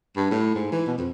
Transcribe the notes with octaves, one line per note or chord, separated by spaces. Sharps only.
G2
A2
G#2
E3
B2
F2